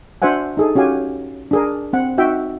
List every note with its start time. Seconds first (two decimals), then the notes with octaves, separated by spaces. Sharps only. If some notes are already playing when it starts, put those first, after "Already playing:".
0.22 D4 F#4 C5 E5 F#5 G#5
0.57 D#4 G#4 A4
0.75 C#4 F#4 G4 F5 G#5
1.51 D4 G#4 A#4
1.93 C4 F#5
2.18 D#4 F#4 E5 G5